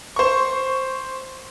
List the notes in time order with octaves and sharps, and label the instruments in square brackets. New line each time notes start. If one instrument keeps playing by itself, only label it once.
[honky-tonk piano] C5 C#6